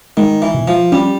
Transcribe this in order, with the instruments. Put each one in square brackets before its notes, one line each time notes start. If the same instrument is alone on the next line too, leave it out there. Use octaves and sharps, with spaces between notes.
[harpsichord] D#3 [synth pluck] G#3
[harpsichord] E3
[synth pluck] B2
[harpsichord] F3
[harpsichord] G3 [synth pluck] C#4